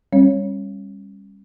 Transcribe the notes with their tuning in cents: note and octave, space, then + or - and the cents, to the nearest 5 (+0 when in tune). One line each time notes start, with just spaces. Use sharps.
G3 +25 C#4 -30 C#5 +0